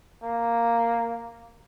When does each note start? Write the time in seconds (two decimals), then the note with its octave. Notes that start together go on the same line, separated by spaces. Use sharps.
0.23 A#3